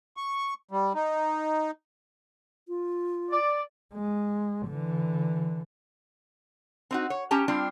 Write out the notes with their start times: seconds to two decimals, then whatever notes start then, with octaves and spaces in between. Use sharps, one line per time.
0.17 C#6
0.71 G3
0.95 D#4
2.68 F4
3.31 D5
3.94 G#3
4.67 D3 E3
6.91 C4 D#4 F#4
7.10 C#5
7.31 C#4 G4 A5 A#5
7.48 G3 C4 D4 F4